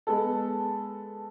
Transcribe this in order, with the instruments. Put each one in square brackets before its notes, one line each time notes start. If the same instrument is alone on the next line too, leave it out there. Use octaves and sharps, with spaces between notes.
[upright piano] G#3 B3 A4